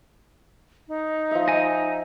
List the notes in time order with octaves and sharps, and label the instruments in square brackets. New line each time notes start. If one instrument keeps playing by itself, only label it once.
[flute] D#4
[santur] F3 E5
[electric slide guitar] D#5 G#5